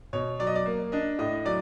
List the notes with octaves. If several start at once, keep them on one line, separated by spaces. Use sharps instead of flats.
B2 C#5
F#3 D5
D#5
D5
A#3
D4 D#5
A2 D#5
F#3 D5